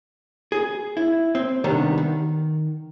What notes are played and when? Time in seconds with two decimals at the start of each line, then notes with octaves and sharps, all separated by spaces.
0.52 G#4
0.97 E4
1.35 C4
1.64 C3 D#3 G3 B3 D4
1.98 D#3